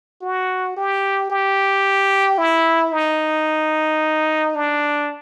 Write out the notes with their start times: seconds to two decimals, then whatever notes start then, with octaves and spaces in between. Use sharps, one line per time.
0.21 F#4
0.77 G4
1.30 G4
2.38 E4
2.92 D#4
4.55 D4